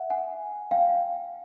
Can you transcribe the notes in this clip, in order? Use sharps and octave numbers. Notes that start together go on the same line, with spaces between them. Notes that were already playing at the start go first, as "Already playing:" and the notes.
Already playing: E5 F#5
F#5 G#5
F5 G5